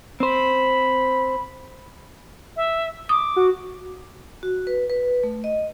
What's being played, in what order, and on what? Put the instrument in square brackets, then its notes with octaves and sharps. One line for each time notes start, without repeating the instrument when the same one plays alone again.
[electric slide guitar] C4 C5 [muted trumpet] B5
[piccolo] E5
[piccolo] D6 [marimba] D#6
[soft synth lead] F#4
[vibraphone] F#4
B4
B4
A3
D#5